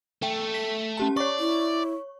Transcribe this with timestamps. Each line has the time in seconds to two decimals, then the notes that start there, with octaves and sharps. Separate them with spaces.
0.23 A3 G5
0.54 B6
0.97 C#4 G4 A5
1.17 C#5 D5 C#6
1.39 E4